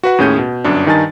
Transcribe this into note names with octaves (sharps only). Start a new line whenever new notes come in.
F#4 B4 F#5
D#2 A2 C#4 G#4 G6 D#7
B2
G1 F#2 D4
G2 D#3 D#4 G#5 A5 A6